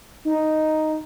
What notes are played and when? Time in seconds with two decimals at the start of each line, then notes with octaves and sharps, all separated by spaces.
0.25 D#4